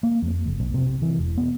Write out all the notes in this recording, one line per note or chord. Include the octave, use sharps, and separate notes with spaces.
A#3
F2
F#1
B1
C3
E3
E1
B3